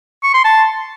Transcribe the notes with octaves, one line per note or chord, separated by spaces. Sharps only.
C#6
C6
A5